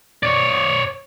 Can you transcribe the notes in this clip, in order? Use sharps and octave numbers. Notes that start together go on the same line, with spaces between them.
C#5 D5